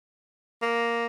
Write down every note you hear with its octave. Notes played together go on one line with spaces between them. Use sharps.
A#3